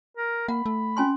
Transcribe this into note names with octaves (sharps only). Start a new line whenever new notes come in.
A#4
A#3 F#5 B5
A3
C#4 G#5 C6